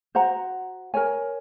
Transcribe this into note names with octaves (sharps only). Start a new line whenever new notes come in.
F#4 C5 F#5 A#5
A#4 C#5 G#5